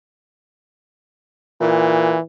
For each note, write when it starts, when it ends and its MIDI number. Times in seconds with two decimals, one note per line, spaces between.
1.61 2.16 46
1.61 2.20 52